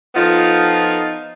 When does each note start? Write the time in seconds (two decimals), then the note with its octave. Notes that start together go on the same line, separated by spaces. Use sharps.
0.15 F3 B3 D#4 F4 A4